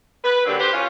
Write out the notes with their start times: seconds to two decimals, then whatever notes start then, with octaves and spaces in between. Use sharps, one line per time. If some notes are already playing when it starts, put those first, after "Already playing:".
0.24 B4
0.45 D3 F#3 A#3 C4 D4 G4
0.59 G4 B4 C5
0.73 C#4 F4